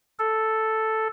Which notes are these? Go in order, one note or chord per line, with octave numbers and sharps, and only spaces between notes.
A4